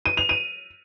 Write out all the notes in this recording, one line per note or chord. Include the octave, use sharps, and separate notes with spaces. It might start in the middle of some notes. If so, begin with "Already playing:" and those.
D#7
F7
D#7